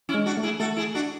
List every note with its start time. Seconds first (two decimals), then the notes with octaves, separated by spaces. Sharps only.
0.09 C#4 E4
0.14 G#3
0.26 D4 F#4
0.37 A3
0.43 E4 G#4
0.60 A3 F#4 A4
0.76 E4 G#4
0.94 D4 F#4